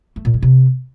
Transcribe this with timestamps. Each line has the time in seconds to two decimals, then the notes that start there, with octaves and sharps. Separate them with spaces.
0.16 A3
0.25 A#2
0.34 G#3
0.42 C3